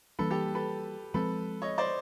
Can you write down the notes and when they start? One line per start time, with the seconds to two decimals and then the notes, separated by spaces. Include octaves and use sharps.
0.19 E3 G3 A#3 D4 A4 B4
0.31 G4 A4
0.55 A4 B4
1.14 F3 G#3 C4 A4 B4
1.62 C#5 D#5
1.78 C5 D5